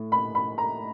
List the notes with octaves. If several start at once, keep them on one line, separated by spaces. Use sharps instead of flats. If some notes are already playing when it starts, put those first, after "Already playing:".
Already playing: A2
B5
B5
A#5